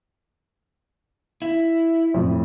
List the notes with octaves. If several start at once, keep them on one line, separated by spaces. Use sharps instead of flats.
E4
F2 A2